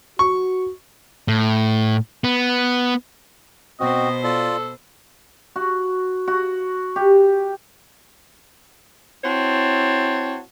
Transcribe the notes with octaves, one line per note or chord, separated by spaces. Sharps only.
F#4 C#6
A2
B3
B2 C4 F#4 C5 D#5
F4 A4 D5
F#4
F#4
G4
C4 E4 F#4 C#5 A5